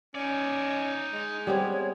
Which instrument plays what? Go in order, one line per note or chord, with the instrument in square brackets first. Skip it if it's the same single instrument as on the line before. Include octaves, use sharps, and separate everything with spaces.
[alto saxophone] C#4 [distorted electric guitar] D#4 D5
[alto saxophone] G#3
[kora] G3 B3 C4 [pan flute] C#5